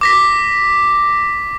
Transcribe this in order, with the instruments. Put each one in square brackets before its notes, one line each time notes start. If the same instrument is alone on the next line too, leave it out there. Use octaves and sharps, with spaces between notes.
[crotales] D6 A#6 B6